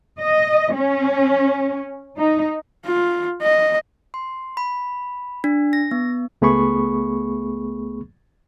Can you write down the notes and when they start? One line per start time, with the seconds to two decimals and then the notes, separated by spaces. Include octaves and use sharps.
0.20 D#5
0.75 C#4
2.19 D#4
2.86 F4
3.42 D#5
4.14 C6
4.57 B5
5.44 D4
5.73 A#6
5.91 B3
6.42 C#2 A3 B3 G#4 B5 C#6